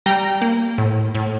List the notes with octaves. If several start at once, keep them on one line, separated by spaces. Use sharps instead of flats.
G3 G5 A#5
A#3
A2
A2